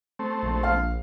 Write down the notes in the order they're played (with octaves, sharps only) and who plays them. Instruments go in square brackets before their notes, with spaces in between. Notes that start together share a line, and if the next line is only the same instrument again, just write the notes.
[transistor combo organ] A3 C4
[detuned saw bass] A#1
[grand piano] F5